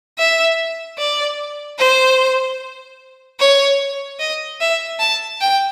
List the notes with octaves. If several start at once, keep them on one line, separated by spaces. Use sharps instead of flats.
E5
D5
C5
C#5
D#5
E5
A5
G5